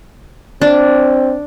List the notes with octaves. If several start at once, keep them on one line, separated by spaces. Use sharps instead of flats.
C4 D4